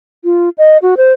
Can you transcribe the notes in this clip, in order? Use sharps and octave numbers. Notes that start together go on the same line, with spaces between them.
F4
D#5
F#4
C5